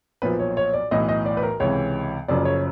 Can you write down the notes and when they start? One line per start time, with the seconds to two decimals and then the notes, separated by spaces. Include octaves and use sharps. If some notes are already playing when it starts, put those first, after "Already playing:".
0.22 B1 A#2 F3 B4
0.40 C#5
0.57 C#5
0.73 D5
0.91 B1 A2 E3 D#5
1.09 D#5
1.25 D5
1.37 B4
1.43 A#4
1.60 C#2 C3 E3 C#5
2.28 F#1 F#2 C#3 F3 D5
2.45 C#5